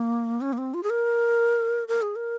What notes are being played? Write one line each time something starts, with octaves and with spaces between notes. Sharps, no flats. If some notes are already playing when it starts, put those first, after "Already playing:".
Already playing: A#3
C#4
A#3
C4
F4
G#4
A#4
A#4
G#4
A#4